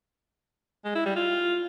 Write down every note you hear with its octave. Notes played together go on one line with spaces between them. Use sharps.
G#3
E4
G3
F4